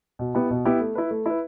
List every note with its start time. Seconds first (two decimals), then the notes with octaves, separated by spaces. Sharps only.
0.19 B2
0.35 B3 E4 G4
0.50 B2
0.65 B3 E4 G4
0.80 A3
0.95 E4 B4
1.11 A3
1.26 E4 B4